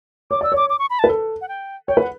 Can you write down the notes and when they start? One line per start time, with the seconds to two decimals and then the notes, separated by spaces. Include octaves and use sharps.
0.31 C#5 D6
0.41 D5 E6
0.52 C#5 D6
0.70 D6
0.79 C#6
0.90 B5
0.99 A5
1.04 B4
1.09 A4
1.41 F#5
1.48 G5
1.88 C#5 G5
1.97 B4
2.01 F#5